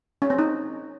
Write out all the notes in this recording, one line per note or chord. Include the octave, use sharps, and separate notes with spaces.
C#4
C4
D#4